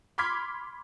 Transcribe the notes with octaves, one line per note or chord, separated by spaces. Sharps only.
B5 C6 D6 F6 G#6 B6